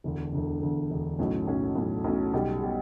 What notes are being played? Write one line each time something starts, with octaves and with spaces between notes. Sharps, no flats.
E1 D2 D3
E1 D2 D3
E1 D2 D3
E1 D2 D3
B1 A2 F#3 C#4
B1 A2 F#3 C#4
B1 A2 F#3 C#4
B1 A2 F#3 C#4
B1 B2 G3
B2 G3